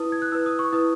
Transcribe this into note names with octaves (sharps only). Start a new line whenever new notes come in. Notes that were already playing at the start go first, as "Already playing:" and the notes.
Already playing: E4 B4 D#6
G#6
F#6
E4 B4 E6
D#6
C#6
E4 B4 D#6